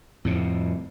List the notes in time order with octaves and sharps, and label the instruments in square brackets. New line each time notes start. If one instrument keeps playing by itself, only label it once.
[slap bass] F2 A2 C3